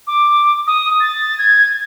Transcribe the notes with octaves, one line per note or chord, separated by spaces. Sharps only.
D6
D#6
A6
G#6